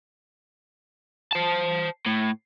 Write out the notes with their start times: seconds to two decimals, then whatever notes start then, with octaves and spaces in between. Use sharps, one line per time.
1.32 C5 A5
2.07 A2